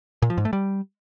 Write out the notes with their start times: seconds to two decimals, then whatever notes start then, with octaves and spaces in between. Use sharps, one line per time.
0.22 A#2
0.30 F3
0.38 G#2
0.45 A3
0.53 G3